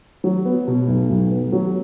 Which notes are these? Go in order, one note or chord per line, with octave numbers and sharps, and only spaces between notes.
F#3
B3
B2
B1
B1
B3
F#3